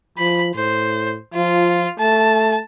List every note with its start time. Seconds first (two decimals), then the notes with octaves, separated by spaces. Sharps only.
0.18 F3 B5
0.55 A2 C5
1.34 F3 F4
1.99 A3 A5